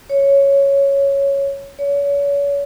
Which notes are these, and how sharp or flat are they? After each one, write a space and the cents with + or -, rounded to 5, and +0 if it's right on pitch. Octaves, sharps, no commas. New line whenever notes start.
C#5 +0
C#5 +35